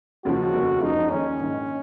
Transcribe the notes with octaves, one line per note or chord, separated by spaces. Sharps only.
D#2 C#3 F3 F#4
F1 D#2 C#3
F#1 F#2 F3 G#3 D#4
D#2 D#3 G#3 C#4
A#1 G#2 D#3